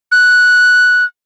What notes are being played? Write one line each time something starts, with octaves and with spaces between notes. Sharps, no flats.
F#6